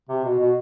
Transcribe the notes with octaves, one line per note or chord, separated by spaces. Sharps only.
C3
B2
B2